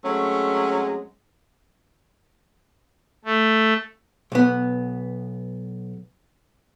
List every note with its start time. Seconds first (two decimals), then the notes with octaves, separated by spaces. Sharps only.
0.05 F#3 G#3 A3 C4 C#4
3.25 A3
4.32 B1 B3